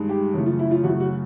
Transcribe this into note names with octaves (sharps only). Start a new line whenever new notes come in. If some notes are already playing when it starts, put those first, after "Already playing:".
Already playing: G2 D#3 G#3
G4
F#2 C#3 E3 A3
F4
E4
F4
F#2 C#3 E3 A3 F#4
F#4